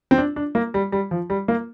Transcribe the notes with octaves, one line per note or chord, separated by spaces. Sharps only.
C4
D4
D4
A#3
G3
G3
F3
G3
A#3